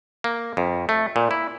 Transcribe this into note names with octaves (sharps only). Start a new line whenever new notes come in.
A#3
F2
A3
A#2
E4